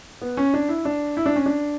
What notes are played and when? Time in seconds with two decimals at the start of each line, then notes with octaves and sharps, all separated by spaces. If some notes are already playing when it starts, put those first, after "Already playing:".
0.21 B3
0.37 C#4
0.54 D4
0.69 E4
0.85 D4
1.17 E4
1.26 D4
1.36 C#4
1.46 D4